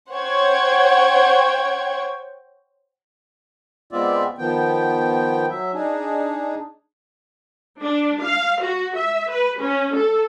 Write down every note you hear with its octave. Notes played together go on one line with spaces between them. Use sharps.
C5 C#5 F#5 G5 C#6 G#6
G#3 B3 C4 F4 D5 E5
D#3 F3 B3 G5
F#3 E5
D4 D#4 G#4
D4
F5
F#4
E5
B4
C#4
A4